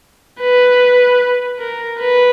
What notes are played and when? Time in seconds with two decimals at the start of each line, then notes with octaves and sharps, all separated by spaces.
0.41 B4
1.60 A#4
2.00 B4